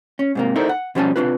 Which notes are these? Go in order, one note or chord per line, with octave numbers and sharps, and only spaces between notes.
C#4
G#2 C3 A#3
D#4 E4 A4 A#4 C5 D5
F#5
B2 F3 G3 C#4 G#5 A5
C3 A3 D4 F4 B4